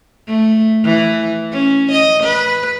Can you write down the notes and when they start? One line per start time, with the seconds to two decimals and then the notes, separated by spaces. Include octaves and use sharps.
0.28 A3
0.84 E3
1.52 C#4
1.92 D#5
2.23 B4